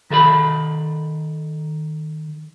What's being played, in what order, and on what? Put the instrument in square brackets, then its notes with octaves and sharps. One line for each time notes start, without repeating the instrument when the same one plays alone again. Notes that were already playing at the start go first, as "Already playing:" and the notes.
[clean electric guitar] D#3 A4 E5 B5